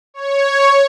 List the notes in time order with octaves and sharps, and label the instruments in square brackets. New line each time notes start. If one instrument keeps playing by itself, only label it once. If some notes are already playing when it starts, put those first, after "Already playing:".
[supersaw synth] C#5